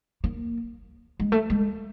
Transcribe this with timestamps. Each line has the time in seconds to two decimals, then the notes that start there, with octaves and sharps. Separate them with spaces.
0.24 A#3
1.20 G#3
1.32 A3
1.50 G#3